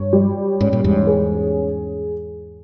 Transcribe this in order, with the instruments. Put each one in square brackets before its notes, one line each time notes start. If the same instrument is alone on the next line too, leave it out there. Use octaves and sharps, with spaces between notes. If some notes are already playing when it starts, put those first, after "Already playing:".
Already playing: [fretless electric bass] G2 [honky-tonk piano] C#5
[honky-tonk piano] G3
[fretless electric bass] G#2 [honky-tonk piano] C#4
[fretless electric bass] A#2
E2 G#2
[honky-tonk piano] G#4